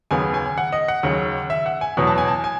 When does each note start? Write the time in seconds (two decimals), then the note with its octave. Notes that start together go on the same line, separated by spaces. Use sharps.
0.11 D#2 C#3 F#3 B3 G#5
0.34 G#5
0.58 F#5
0.72 D#5
0.88 F#5
1.03 D#2 C#3 F#3
1.50 E5
1.66 F#5
1.81 G#5
1.97 E2 B2 F#3 B3
2.07 A5
2.18 G#5
2.28 A5
2.44 G#5